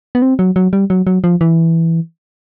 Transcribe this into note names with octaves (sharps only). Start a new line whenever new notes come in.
B3
C4
F#3
F#3
G3
F#3
F#3
F3
E3